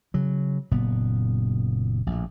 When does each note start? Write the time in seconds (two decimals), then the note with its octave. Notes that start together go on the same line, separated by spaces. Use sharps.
0.14 C#3 F#3
0.71 F#1 A#2 B3
2.07 A#1 A2